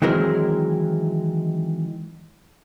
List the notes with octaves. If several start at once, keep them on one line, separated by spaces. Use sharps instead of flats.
D#3 E3 F#3 G#3 C4 A#4